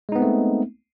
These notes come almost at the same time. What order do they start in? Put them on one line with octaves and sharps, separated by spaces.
G#3 D#4 B3 C4 A3